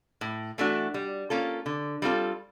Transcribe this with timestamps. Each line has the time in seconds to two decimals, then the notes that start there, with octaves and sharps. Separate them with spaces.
0.21 A2
0.58 E3 A3 D4 F#4
0.94 G3
1.30 A#3 C#4 F4 A4
1.66 D3
2.02 G3 C4 F4 A4